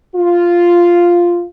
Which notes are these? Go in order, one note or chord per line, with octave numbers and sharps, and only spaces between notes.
F4